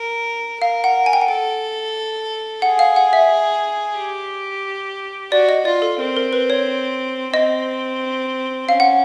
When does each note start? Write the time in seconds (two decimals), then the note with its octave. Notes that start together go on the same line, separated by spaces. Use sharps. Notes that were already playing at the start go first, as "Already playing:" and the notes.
Already playing: A#4
0.61 A#4 F5
0.84 F#5
1.06 G#5
1.13 G5
1.21 F#5
1.28 A4 G5
2.62 G#4 F#5
2.79 F5
2.96 F#5
3.13 E5
3.97 G4
5.32 F#4 D5
5.49 D#5
5.65 F4 D5
5.82 A4
5.99 C4 A#4
6.17 A#4
6.33 B4
6.50 C#5
7.34 C4 D#5
8.68 C#4 F5
8.80 F#5